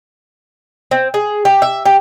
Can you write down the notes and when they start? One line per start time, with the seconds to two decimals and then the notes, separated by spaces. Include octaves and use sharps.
0.91 C4
1.14 G#4
1.45 G4
1.62 E5
1.85 G4